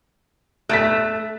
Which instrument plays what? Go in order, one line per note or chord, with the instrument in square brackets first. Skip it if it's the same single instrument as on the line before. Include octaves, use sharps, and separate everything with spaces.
[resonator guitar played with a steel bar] A3 [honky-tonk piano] F#6 A6 B6